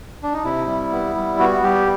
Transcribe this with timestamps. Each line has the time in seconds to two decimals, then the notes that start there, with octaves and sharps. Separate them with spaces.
0.23 D4
0.33 D#4
0.44 C3 E4
0.67 G3
0.92 B3
1.15 G3
1.39 B3 F#4
1.63 G3 G4